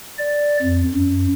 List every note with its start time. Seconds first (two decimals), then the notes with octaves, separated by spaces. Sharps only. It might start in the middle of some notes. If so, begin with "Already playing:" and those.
0.18 D5
0.62 F2
0.94 F#2